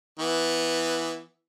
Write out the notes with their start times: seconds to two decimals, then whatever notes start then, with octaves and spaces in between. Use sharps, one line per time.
0.19 E3 B3